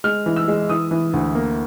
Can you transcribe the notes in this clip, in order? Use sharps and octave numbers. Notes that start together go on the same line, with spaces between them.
G#3 F6
E3
E6
G#3
E3 D#6
E3
D2
A#3